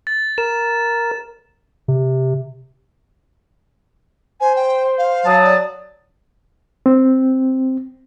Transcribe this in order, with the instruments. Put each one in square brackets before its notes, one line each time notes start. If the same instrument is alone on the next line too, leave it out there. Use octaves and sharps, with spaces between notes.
[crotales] A6
[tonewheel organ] A#4 [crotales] E7
[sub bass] C3
[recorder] C5 [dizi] G#5
[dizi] G5
F5
[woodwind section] F#3 A5 D#6
[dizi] D5
[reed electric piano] C4